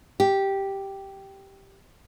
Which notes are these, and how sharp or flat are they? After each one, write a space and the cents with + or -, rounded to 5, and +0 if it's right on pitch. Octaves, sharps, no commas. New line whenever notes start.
G4 -5